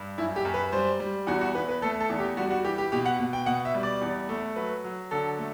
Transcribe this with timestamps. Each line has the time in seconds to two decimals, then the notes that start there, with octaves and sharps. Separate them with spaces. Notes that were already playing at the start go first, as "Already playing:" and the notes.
Already playing: G2
0.18 F#2 E4
0.36 G4
0.45 F#2
0.54 B4
0.72 G3 C5
1.00 G3
1.27 E2 F#4
1.41 F#4
1.55 E2 B4
1.69 B4
1.82 A3 A4
2.00 A4
2.10 E2
2.19 G4
2.37 G3 F#4
2.51 F#4
2.65 E3 G4
2.78 G4
2.92 B2 G4
3.06 F#5
3.20 B2
3.33 G5
3.46 B2 F#5
3.65 E5
3.74 G3
3.83 D5
4.01 E2
4.29 A3
4.56 F#3 B4
4.84 F#3
5.11 D3 A4
5.38 A3